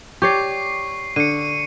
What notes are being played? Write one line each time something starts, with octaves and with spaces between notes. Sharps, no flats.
G4 C#5 D5 C#6 C7
D3 C#7 D#7